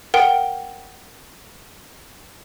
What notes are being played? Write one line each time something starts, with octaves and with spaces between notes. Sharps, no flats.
A#4 F#5 G5